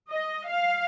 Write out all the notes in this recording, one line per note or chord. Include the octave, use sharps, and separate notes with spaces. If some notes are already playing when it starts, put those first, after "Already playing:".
D#5
F5